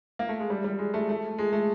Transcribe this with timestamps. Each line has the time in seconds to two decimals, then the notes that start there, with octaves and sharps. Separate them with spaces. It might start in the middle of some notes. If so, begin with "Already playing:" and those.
0.19 A#3
0.29 A3
0.40 G#3
0.50 G3
0.64 G3
0.78 G#3
0.94 A3
1.09 A3
1.38 G#3
1.53 A3